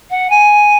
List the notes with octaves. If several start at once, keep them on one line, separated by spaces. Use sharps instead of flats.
F#5
G#5